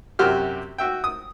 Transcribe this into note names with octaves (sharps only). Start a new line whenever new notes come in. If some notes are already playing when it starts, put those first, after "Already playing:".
F#2 C3 F#4 G4 F6
F#4 E5 G5
D#6